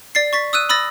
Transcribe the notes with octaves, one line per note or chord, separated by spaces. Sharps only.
D5 A6 C7
C#6 A6 B6
D#6 E6 F#6 D#7
B5 D#6 E6 A6 A#6